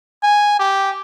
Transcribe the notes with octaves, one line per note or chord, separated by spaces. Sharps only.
G#5
G4